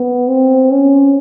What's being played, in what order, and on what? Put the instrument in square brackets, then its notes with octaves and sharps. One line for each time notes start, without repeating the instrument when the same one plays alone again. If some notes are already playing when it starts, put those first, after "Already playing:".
Already playing: [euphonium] B3
C4
C#4